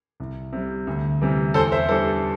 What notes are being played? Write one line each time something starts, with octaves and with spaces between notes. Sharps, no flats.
C2
C3 G3
D2
C3 E3 G3
E2 A4 C5
C5 E5
E3 G3 D4 A4 C5